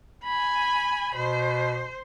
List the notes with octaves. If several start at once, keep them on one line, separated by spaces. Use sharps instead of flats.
G#5 B5
B2 C5